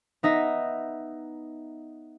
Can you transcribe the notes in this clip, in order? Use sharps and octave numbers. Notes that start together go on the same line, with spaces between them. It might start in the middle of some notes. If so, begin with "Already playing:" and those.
B3 D#4 D#5 E5